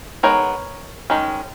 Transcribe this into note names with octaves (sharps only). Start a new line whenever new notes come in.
G#3 B3 D#4 A#4 C#5
D#3 G#3 C#4